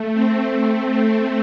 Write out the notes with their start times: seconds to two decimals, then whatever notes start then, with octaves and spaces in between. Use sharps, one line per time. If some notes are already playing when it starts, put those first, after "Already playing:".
Already playing: A3
0.13 A3 C4
0.53 A3 C4
0.92 A3 C4